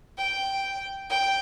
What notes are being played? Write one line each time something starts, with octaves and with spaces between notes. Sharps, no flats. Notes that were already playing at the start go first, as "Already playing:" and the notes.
G5
G5